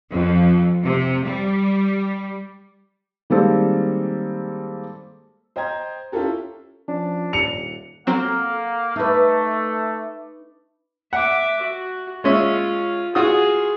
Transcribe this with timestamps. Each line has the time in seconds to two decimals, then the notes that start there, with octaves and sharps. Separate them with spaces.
0.10 F2
0.84 C3
1.24 G3
3.30 D#3 G3 G#3 A#3 C4 A4
5.56 C5 D#5 G5 A#5 G#6
6.12 C#4 E4 F4 G4 A4 A#4
6.88 F3 C#4 D4
7.33 D#1 C#7 F7
8.07 F#3 A#3 C4 A4 F5 F#5 A#5
8.96 A3 D#4 B4 E5 D6
11.13 E5 F#5 D6
11.62 F#4
12.24 G#3 C#4 F4 E5
13.15 F4 F#4 G#4 D#6